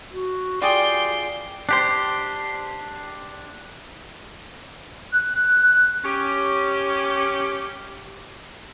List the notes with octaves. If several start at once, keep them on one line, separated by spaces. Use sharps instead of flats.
F#4
F4 G4 G#4 D5 G5 C6
D4 G4 C5
F#6
C#4 G4